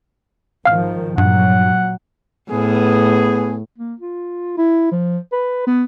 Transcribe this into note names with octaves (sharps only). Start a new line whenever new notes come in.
G#1 D#3 F3 F5 F6
G2 A#2 F#3 F#5
A2 B3 G#4
A#3
F4
E4
F3
B4
B3